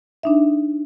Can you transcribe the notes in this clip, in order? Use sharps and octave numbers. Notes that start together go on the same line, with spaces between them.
D4 D#4 E5